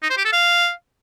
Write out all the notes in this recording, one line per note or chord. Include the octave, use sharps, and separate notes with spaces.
D#4
C5
G4
A4
F5